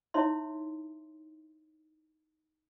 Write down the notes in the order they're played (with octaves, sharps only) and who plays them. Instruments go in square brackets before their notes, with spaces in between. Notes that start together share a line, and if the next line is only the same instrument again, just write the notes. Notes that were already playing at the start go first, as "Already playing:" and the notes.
[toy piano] D#4 E4 C#5 E5 C6